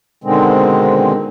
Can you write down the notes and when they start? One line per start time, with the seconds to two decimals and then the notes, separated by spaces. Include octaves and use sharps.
0.24 B2 D3 D#3 G#3 C4